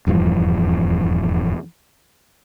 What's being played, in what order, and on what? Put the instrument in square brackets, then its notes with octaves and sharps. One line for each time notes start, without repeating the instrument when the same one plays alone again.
[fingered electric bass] D#1 E2 G2 F3